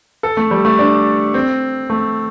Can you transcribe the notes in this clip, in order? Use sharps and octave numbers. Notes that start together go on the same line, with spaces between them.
A4
A3
G3
A3
D4
C4
A3